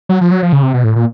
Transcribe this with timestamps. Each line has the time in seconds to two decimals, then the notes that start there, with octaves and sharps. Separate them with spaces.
0.09 F#3
0.21 F3
0.31 F#3
0.43 F3
0.53 C#3
0.63 C3
0.74 B2
0.84 A2
0.96 A#2